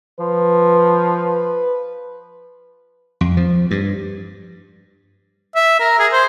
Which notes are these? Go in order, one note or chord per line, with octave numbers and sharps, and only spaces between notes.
F3 B4
F2
F3
G2
E5
A#4
G#4
C5